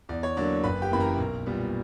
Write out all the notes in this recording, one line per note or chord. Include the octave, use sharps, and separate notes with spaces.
E2 D5
C#5
D3 F#3 A#3 D4 D5
F#1 B4 B5
G4 G5
F#2 E3 A#3 B5
A#4 A#5
B1
A#2 G3 B3